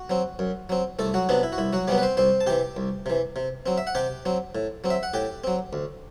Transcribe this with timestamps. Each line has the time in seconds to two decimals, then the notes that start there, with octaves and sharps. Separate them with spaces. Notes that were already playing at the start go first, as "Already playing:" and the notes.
Already playing: F#4
0.10 F#3 C4
0.39 F#2
0.69 F#3 C4
0.99 C2 A3 A4
1.14 F#3 F#4
1.29 C3 F#3 B3 D4
1.43 E4
1.52 F#4
1.58 C2 E4
1.73 F#3 F#4
1.88 C3 F#3 G3 B3 G4
1.98 B4
2.02 C4 C5
2.17 C2 C4 C5
2.41 A5
2.47 C3 E3 G4 G5
2.77 C2
3.06 C3 E3
3.36 C3
3.66 F#3 C4
3.78 E5
3.87 F#5
3.95 C3 G4 G5
4.25 F#3 C4
4.55 A2
4.84 F#3 C4
4.90 E5
5.03 F#5
5.14 A2 G4 G5
5.44 F#3 C4
5.73 D2